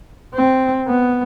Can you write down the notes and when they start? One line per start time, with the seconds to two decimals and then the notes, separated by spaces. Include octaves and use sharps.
0.34 C4
0.87 B3